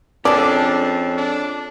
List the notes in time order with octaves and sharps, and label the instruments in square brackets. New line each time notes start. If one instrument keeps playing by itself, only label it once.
[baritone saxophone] F2 [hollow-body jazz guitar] C#4 G#4 A4 [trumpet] D4 [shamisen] D5
[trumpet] D4